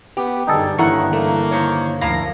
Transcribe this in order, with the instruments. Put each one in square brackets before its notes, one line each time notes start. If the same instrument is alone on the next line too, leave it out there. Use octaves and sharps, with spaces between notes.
[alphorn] B3 [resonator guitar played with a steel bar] G4
[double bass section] G2 D3 [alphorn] G3 [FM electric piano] D#4 G#4 A4
[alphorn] A2 [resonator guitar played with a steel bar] D#3 A#3 F#5 [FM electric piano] E3 C#6
[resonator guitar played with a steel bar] A3 [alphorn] A#3
[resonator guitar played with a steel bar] D#3 C5 C#5
[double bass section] D2 F3 [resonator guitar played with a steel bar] A2 E4 F5 [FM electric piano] A#4 A#6